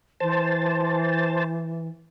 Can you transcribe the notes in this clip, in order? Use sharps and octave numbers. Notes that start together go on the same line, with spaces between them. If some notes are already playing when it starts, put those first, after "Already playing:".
E3 C5 A5